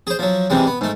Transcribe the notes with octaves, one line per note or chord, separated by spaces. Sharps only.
G#4 C5
F3 F#3
C3 E3 G3 G#3
B3
G#2 A3